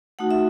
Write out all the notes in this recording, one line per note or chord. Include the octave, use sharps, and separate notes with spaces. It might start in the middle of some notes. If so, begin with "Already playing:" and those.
A3 D#4 F#4 F#5
E5